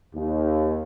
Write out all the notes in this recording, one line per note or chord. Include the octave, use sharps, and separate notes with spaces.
D#2